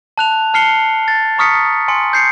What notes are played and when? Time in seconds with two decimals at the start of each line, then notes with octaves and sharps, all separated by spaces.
0.18 A5 F#6 F7
0.54 A5 F6 C7 C#7 G7
1.08 A6
1.38 A#5 C#6 D#6 F6 B6 C#7
1.88 G#5 C6 C#7
2.13 G6 C7 C#7